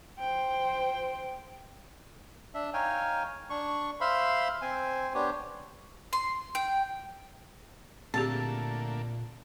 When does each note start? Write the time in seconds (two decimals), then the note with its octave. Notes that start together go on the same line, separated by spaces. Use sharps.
0.19 C5 G5
2.54 D4 E5
2.74 D#4 C#5 F5 G5 G#5
3.50 D4 C#6
4.01 C5 E5 F5 B5 C6
4.62 C4 C5 G#5
5.15 B3 D4 G4 C5 C#5
6.13 C6
6.55 G5
8.14 A#2 D3 A3 A#3 C4 G4 G#4 A5